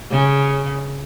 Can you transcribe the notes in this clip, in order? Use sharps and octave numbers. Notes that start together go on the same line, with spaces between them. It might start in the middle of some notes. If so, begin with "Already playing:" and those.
C#3